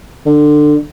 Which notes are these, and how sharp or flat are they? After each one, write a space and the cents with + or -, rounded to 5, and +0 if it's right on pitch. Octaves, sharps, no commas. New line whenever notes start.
D3 +20